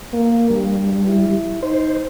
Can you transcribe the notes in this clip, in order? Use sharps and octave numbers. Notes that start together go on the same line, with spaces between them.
A#3
G2 G3
E4
D#4 C5